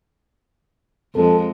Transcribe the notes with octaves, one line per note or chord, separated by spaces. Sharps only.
F2 G#3 A4